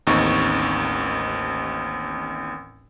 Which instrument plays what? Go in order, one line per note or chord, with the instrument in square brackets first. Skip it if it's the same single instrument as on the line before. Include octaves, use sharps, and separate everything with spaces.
[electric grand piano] A1 D#2 C4 D#4 C#6